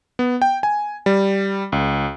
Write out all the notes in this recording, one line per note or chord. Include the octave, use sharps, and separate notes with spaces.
B3
G5
G#5
G3
C#2